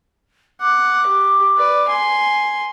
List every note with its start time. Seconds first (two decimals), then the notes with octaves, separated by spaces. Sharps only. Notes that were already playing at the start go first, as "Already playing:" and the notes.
0.61 F#5 D6
1.07 G4
1.57 B4 D5
1.89 G#5 C6